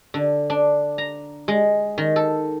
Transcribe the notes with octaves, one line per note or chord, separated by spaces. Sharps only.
D3
D4
A#5
G#3
D#3
A4